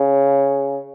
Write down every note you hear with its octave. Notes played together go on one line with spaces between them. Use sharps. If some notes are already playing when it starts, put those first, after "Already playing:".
Already playing: C#3